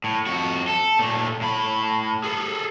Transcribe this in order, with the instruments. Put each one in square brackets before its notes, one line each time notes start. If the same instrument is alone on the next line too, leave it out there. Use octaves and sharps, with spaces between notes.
[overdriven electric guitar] A2
F2 F#4
A4
A#2 A3
A2 B5
G#4 A4